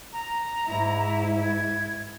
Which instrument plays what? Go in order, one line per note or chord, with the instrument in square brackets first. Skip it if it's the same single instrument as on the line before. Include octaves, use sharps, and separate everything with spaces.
[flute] A#5
[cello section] G#2 E4
[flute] G#6